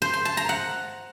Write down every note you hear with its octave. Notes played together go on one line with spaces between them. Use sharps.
C5
C6
A5
A#5
F#5